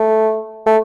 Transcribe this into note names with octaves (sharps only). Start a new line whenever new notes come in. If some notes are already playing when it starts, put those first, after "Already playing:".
Already playing: A3
A3